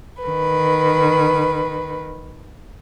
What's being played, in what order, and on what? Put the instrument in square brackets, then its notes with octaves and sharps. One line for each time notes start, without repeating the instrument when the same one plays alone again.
[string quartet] D#3 B4